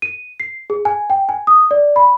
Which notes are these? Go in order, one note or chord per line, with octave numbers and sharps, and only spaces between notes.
D#7
C7
G#4
G#5
G5
G#5
D#6
D5
B5